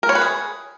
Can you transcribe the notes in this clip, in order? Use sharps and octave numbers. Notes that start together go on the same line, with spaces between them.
A#4
C#5
B4
G#4